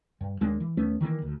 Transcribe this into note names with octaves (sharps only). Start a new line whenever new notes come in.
G2
D#2 G#3 A#3 D4
E3
D#2 A3 B3 C#4
D#3 E3 A3 A#3
D2